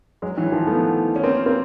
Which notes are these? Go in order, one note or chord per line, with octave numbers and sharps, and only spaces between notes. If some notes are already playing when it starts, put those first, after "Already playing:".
F#3 G#3
E3 F#3
D#3 F3
A3 B3
C#4
A#3 C4
A#3 C4